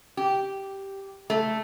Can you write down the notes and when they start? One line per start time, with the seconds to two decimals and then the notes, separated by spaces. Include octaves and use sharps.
0.17 G4
1.30 A3